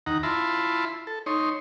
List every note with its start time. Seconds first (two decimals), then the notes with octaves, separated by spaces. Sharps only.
0.06 D#2 D#4 F#5 A#5
0.23 E4 F4 E5 A5 B5 C6
1.07 A4
1.26 D#4 C#5 C6